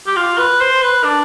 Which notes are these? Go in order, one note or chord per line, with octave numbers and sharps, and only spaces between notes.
G4
F4
B4
C5
B4
D4